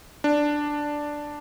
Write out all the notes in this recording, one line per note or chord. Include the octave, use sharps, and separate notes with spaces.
D4